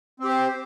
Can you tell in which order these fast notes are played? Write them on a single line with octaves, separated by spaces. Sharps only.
C4 G4 C5